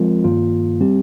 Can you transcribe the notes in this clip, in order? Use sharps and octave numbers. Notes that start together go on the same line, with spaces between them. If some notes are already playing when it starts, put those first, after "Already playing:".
Already playing: F3 G#3 C4 F4 A#4
G2 D#3 A#3 F4
G3 C4 G4